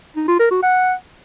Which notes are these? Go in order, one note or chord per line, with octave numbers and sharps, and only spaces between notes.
D#4
F4
A#4
F#4
F#5